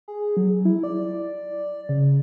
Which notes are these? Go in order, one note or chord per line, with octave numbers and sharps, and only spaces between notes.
G#4
F#3
E4
D5
C#3